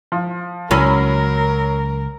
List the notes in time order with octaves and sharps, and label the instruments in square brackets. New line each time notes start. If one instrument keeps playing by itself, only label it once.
[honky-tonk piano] F3
[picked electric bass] C#2 [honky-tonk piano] F#3 B5 [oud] C#4 [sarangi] A#4